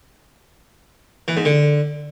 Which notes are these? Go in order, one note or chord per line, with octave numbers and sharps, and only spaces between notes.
E3
G#2
D3